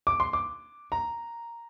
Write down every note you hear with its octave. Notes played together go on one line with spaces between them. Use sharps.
D6
C6
D6
A#5